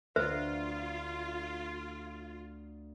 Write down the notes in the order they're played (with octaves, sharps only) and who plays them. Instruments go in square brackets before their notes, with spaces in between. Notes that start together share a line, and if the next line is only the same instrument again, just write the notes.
[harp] D2 [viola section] F4 [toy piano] B4 C5 E5